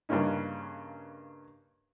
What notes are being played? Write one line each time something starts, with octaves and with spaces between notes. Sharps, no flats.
G2 C#3 A#3 C#4 D#4